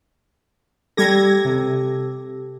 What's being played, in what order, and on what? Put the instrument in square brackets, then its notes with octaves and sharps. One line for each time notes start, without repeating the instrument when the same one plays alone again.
[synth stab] G3 G#6 A#6 [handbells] G4 A4
[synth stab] C3